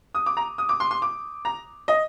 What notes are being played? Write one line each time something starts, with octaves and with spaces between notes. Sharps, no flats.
D#6
D6
A#5
D#6
D6
C6
C6
D6
A#5
D#5